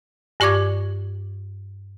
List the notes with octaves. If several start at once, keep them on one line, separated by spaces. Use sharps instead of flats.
G2 G4 D5 C#6 D6 G#6